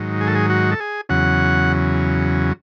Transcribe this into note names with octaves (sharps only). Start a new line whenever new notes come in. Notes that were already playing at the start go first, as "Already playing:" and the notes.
Already playing: G#2 D#3 F#3
G#4
A4
G#4
F#4
A4
G#4
E2 C#3 F#3 F#5